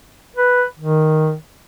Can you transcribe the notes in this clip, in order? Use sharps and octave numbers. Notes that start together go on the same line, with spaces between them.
B4
D#3